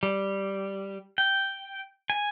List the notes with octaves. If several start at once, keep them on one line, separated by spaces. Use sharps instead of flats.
G3
G5
G#5